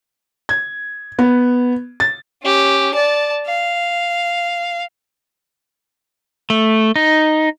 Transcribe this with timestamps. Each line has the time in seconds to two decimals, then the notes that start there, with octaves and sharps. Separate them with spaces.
0.49 G#6
1.19 B3
2.00 A6
2.43 C#4 G4
2.94 D5 A5
3.46 F5
6.50 A3
6.96 D#4